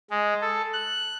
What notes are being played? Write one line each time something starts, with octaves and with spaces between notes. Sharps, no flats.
G#3
A4
F#6